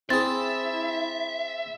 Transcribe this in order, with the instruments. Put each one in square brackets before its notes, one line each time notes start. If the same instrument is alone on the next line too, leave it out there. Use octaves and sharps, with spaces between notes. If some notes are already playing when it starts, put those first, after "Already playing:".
[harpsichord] C4 G#4 [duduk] E4 [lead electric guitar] E5 [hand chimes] A6